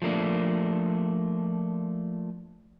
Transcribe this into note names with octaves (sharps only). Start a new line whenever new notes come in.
F3 A3 A#3 D4